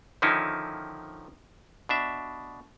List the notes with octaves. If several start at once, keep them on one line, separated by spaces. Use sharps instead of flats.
D3 D#3 F3 C#4 D#4 E4
B2 D4 E5